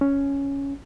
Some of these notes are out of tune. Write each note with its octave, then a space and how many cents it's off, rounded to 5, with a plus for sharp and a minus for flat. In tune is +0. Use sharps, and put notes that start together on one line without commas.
C#4 +5